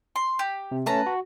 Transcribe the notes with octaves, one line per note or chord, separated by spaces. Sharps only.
C6
G4
C3
A3 C#4 B4 A5 A#5
F#4